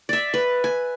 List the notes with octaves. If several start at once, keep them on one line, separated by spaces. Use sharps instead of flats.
D5 E5
B4
G#5